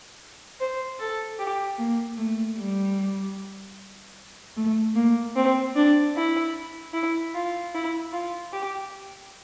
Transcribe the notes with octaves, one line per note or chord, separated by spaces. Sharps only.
C5
A4
G4
A#3
A3
G3
A3
A#3
C4
D4
E4
E4
F4
E4
F4
G4